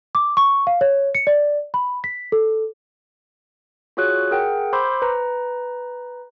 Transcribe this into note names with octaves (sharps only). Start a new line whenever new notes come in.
D6
C#6
F5
C#5
C#7
D5
B5
B6
A4
F4 F#4 G#4 C#5 F#6
G#4 A#4 F#5 G5
C5 B5 C6 D6 E6 G6
B4 A#5